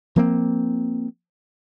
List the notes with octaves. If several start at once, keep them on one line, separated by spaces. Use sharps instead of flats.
F3 A#3 C4